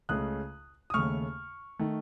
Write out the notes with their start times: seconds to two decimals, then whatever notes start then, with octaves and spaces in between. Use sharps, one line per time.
0.09 C#2 C#3 A3 D#6 F#6
0.90 D#6
0.94 D#2 C#3 A3 C#6 F6
1.79 D#3 A3